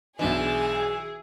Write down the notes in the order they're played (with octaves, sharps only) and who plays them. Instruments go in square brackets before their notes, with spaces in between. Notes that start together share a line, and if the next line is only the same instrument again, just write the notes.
[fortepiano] B1 D4 D#5 [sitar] E3 [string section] G#4 [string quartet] E5 G#5